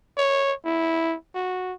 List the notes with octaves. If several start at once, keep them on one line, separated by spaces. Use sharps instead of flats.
C#5
E4
F#4